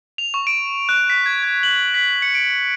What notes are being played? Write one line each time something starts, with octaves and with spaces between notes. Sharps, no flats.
F7
C#6
D7
F#6
B6
G#6
G#6
F#7
B6
C#7
D7